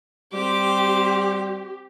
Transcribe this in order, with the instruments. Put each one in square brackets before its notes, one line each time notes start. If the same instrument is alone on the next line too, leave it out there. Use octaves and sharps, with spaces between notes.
[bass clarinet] G3 [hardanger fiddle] C4 D6 [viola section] G4